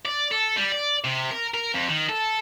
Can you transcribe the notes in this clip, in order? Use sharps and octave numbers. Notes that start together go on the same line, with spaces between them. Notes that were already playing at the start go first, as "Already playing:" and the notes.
D5
A4
G3
D5
C3
A#4
A#4
F2
D#3
A4